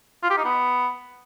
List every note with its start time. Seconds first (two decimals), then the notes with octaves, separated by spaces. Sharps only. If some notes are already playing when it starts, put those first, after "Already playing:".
0.23 F4
0.30 G4
0.37 D#4
0.44 B3